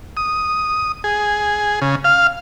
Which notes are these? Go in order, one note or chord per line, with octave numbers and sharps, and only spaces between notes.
D#6
G#4
C#3
F5